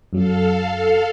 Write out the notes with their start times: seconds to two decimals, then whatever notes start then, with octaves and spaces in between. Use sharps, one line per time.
0.13 F#2 F#3 A4 F5